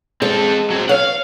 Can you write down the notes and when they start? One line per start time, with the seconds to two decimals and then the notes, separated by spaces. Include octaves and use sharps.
0.22 G#3 C4 A4
0.71 F#3 C4
0.89 C#5 F5 F#5